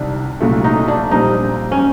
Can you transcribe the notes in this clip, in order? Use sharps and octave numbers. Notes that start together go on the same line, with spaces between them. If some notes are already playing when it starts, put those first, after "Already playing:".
Already playing: C2 C3 D#3 G3 D4
C2 A#2 F#3 A3
D#4
D4
A#1 A#2 G3 C4 D#4
C#4